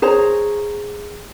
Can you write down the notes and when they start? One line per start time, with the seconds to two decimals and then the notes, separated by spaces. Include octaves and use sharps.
0.02 G#4 C5 C#5 A#5